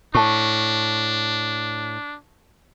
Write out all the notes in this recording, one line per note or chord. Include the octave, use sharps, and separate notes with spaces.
A2 D4 A5 C#6